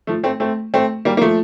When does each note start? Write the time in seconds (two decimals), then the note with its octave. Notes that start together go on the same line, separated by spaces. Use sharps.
0.07 F3 A3
0.23 A3 C4
0.40 A3 C4
0.74 A3 C4
1.05 G3 A#3
1.17 A#3
1.21 F3 A3